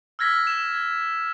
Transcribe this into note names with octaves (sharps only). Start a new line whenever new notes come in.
E6 F6 G#6 A#6 B6
E7
G#6